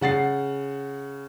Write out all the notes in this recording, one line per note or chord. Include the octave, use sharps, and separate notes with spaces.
C#3 F#5 A6 C7